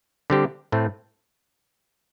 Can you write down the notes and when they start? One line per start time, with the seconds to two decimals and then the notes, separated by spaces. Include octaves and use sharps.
0.30 D3 G3 C4 G4
0.72 A2 A3 C4